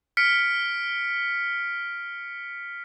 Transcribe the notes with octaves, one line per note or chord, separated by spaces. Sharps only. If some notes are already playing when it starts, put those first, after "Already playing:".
F6 B6 C#7 D7